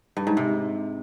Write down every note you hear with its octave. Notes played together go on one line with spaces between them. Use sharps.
G2
G#2
C3